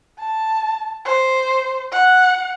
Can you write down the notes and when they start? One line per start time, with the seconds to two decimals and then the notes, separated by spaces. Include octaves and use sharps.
0.19 A5
1.05 C5
1.92 F#5